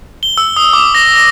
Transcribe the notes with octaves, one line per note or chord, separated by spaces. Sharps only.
G7
E6
D#6
D6
A#6
A#6